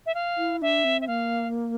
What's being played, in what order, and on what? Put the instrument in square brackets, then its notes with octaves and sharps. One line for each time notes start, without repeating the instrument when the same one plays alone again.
[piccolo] E5
F5
[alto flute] E4
[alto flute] D4 [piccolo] E5
[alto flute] C4
[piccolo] E5
[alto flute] A#3 [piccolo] F5